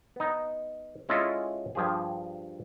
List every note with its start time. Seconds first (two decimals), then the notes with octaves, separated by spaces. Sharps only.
0.16 B3 D#4
1.09 G#3 C#4 E4 F4 A4 D#5
1.75 G2 F3 G4 G#4